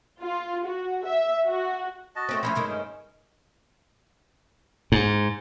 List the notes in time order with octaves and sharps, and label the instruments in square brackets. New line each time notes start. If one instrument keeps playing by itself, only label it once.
[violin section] F4
F#4
E5
F#4
[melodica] F#4 D#5 A5
[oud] A3 C4 C#4
[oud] F3 A3 C#4 [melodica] E4 C5 C#5
[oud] G2 D#3 G#3
[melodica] C#4
[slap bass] G#2